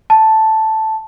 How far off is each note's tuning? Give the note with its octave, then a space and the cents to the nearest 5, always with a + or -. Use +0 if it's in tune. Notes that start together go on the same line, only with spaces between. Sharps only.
A5 +0